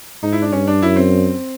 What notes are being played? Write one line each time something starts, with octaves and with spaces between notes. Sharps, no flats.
G#2 D#4
E4
D4
G2 C#4
D4
F#2 E4
C4